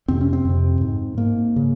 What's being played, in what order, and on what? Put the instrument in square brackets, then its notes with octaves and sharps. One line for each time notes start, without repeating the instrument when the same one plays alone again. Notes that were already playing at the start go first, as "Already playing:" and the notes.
[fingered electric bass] F2 C3 C4
C#4
C4
F2 C3
G#2
G#2 A#3
C#3